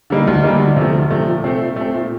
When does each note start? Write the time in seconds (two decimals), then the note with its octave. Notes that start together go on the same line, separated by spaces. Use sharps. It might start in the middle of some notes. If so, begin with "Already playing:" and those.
0.10 D3 G3 A#3 D#4
0.27 D2
0.43 D3 G3 A#3 D#4
0.60 D2
0.76 C3 F3 A3
0.93 D2
1.11 C3 F3 A3
1.28 A#2
1.44 A3 C4
1.61 A#2
1.76 A3 C4
1.94 A#2